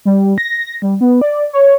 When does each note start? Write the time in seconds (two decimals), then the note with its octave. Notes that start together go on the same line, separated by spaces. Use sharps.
0.05 G3
0.38 A#6
0.82 G3
1.01 B3
1.21 D5
1.53 C#5